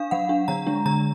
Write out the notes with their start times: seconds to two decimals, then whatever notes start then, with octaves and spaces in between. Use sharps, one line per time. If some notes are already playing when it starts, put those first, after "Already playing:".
Already playing: D4 F5
0.11 F#3 F#5
0.29 D4
0.48 D3 A#5
0.67 G#3 D4
0.86 D3 A#5